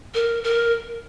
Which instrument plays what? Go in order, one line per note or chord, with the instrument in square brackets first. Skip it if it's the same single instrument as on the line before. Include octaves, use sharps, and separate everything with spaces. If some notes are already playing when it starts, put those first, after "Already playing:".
[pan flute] A#4
A#4